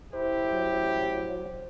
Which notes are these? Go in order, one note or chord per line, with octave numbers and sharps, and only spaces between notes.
A1 E4 G4 C5
F#3